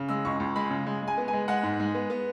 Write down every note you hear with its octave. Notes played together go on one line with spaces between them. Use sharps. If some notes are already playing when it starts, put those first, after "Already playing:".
Already playing: C#3
G#3 E6
C#2 C#6
C#2
G#3 B5
C#3
G#3
G#3
G#5
B3
G#5
G#3
G#3 F#5
G#2
G#3
B3
B3